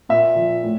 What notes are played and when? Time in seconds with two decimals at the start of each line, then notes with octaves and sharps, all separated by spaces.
0.09 A#2 E5
0.36 F3
0.63 A2